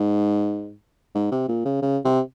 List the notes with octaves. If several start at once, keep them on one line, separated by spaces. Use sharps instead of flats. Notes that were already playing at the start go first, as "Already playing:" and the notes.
Already playing: G#2
G#2
C3
A#2
C#3
C#3
C3